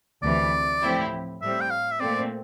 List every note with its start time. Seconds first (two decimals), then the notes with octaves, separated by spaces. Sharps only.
0.22 D2 C3 E3 D5
0.82 A2 F3 C4 E4 G4
1.41 A2 G3 C4 E5
1.61 G5
1.70 F5
1.91 E5
2.00 A#2 A3 C4 D5